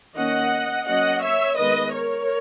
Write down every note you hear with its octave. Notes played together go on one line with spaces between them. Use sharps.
D#3 A#3 C#4 D#5 F#5
F#3 A#3 C#4 D#5 F#5
C#5 E5
D#3 G#3 B3 B4 D#5
A#4 C#5